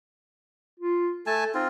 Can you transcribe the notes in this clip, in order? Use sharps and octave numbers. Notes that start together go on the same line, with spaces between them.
F4
A3 A4 G#5 A5
C4 D#4 F4